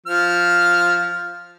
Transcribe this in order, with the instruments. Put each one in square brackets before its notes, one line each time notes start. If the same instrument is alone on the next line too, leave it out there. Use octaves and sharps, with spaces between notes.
[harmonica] F3 F6